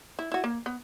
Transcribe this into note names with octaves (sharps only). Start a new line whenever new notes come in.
E4
E4 F#4
A#3
B3